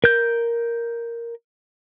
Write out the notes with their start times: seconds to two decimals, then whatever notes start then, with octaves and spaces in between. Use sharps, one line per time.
0.04 A#4 G6